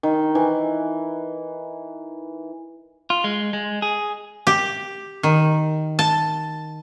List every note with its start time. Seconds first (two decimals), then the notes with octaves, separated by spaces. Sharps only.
0.03 D#3
0.35 E3
3.10 F4
3.24 G#3
3.53 G#3
3.82 G#4
4.47 G4
5.23 D#3
5.99 A5